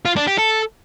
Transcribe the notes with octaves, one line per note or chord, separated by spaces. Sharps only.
F4
D4
G4
A4